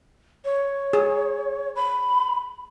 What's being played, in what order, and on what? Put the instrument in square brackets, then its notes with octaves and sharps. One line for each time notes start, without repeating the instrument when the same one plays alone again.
[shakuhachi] C#5
[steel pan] G#4
[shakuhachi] B5